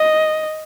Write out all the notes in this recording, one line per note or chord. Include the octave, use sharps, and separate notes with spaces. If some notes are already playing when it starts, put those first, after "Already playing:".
Already playing: D#5